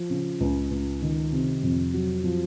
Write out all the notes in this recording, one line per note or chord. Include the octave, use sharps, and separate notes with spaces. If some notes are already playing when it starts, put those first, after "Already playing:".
Already playing: F3
C#3
C#2
C#2
D#3
C3
F2
F#3
F3